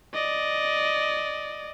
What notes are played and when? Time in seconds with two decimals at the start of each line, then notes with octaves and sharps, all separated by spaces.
0.14 D5 D#5